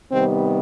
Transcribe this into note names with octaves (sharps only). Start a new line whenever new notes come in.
C3 D#3 G3 B3 C4